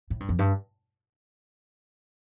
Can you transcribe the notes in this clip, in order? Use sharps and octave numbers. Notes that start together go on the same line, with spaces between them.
A2
G2
F2
G2